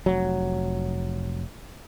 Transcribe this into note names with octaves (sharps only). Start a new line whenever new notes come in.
F1 F#3